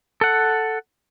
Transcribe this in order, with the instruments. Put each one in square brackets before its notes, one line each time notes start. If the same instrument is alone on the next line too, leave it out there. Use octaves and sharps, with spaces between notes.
[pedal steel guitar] A4 F#5